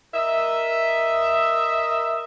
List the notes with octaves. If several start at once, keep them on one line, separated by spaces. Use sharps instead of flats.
A#4 D#5 E5